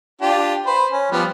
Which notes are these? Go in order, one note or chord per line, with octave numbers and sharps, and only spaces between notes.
D4 F4 G4
B4 C5
C#4
F3 G3 B3